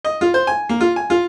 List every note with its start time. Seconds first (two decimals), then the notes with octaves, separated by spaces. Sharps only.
0.05 D#5
0.21 F4
0.34 C5
0.47 G#5
0.69 A#3
0.81 F4
0.96 G#5
1.10 F4